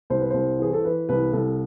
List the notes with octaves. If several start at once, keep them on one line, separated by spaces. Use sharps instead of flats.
C2 C5
B4
C2 C5
E3 G#4
A4
E3 B4
C2 B4
C2 A4